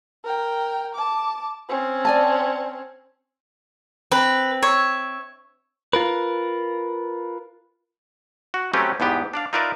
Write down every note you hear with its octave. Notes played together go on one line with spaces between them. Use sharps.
A#4 G5
A5 D6
C4 C#4
D5 G#5 A5
C4 B4
C#5 E5
F4 A#4 B4
F#4
F#3 A3 C4 C#4 G4 B4
E2 G#2 B3 G4
D4 D5 F5
D#4 F4 A#4 B4 D5 E5